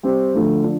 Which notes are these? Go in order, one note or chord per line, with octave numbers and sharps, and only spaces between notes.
G3 C4 G4 C5
D3 F3 A3 D4
F3 D4